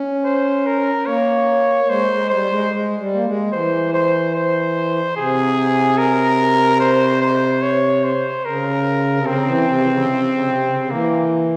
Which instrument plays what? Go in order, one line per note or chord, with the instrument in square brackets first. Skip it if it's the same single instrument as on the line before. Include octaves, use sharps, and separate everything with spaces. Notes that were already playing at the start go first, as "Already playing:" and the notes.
Already playing: [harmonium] C#4
[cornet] C5
A#4
[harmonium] A#3 [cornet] C#5
[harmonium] G#3 [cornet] C5
[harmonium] G#3
[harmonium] G3 [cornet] C5
[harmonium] G#3
G#3
G3
A#3
G#3
[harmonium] E3 [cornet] C5
[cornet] C5
C5
[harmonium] C3 [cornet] G#4
[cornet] A#4
C5
C5
C#5
C5
[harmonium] C#3 [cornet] A#4
[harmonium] C3
[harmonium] C#3 [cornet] C4
[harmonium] E3
C3
E3
C#3
C3
C#3
C3
C#3
C#3
[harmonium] E3 [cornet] A#3